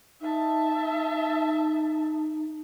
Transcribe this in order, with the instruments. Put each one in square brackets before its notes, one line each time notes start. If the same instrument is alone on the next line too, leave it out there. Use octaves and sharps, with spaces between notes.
[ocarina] D#4 [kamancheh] E5 A5